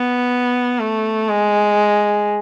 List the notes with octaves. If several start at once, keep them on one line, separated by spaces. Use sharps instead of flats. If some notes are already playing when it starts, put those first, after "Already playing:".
Already playing: B3
A3
G#3